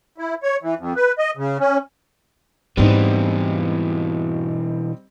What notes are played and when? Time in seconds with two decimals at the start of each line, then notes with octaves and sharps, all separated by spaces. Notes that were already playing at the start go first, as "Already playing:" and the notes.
0.18 E4
0.43 C#5
0.63 E3
0.79 F2
0.96 B4
1.18 D#5
1.37 C#3
1.60 C#4
2.77 G#2 B2 E3 G3 A#3 C4 D#4